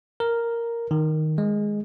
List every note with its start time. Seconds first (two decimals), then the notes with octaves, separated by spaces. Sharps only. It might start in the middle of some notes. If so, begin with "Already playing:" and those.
0.20 A#4
0.91 D#3
1.38 G#3